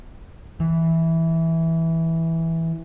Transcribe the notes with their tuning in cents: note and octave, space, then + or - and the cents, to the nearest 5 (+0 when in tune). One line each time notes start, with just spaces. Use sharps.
E3 -10